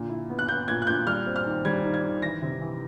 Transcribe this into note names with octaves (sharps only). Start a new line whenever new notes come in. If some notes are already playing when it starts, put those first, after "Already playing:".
Already playing: A#2 D3
E4
B3
F#6
B3 G6
A#2 G#6
F#6
A#2 G6
G3 F6
C4
F6
D#3
G3 G#6
D#3
G#6
D#3
E3 A#6
C3
E3